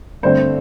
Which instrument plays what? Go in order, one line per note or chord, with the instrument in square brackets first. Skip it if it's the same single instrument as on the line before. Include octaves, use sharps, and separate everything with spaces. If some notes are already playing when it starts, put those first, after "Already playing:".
[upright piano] G2 D3 A3 C4 C5